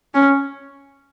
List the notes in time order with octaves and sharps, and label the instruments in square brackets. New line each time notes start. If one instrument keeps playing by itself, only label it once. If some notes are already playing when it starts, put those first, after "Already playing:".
[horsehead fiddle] C#4